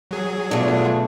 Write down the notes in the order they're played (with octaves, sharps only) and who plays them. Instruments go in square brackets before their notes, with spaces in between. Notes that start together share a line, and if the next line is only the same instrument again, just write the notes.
[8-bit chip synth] F#3 G#4
[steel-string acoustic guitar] B2 A3 [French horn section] D3 D4 F4